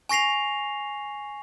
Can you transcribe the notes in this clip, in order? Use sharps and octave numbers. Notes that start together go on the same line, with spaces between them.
G#5 C#6 A#6 C7 F7